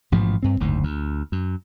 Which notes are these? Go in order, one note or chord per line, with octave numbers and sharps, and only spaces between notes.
A1 G#2 B2 F3
G2 C4
F#1 D2 G#2
D2
F#2